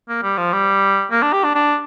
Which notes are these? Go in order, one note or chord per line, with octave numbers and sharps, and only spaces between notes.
A#3
G3
F3
G3
A#3
D4
G4
D4
D4